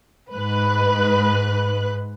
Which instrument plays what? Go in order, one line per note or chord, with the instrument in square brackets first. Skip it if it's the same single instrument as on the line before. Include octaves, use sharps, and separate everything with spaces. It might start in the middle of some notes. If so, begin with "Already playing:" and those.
[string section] G#2 B4 F#6